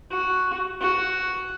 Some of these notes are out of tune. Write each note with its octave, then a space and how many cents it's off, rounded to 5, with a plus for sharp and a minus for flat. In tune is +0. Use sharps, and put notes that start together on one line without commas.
F#4 +0
F#4 +5